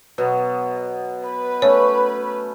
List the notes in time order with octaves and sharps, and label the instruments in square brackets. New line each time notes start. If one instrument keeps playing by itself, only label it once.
[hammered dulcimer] B2 F#3 B3
[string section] B4
[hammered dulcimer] A3 C#4 [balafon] C#5